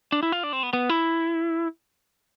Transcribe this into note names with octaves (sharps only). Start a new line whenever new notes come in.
D4
E4
F4
D4
C4
B3
B3
E4